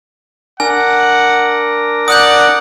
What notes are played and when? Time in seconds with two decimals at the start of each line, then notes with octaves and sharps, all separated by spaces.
0.60 D4 A#4 F#5 G#5
2.08 D5 F#5 D#6 F#6 G6